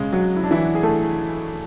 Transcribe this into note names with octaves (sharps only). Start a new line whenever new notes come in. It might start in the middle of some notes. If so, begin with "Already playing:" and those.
Already playing: C#3 G#3
F#3 F#4
E4
D4
E3 E4
G#4
A3 A4